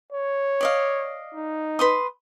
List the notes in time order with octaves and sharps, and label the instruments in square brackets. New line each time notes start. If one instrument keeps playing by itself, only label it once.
[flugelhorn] C#5
[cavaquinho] D5 D#5 F5
[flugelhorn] D#4
[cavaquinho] B4 C6 D#6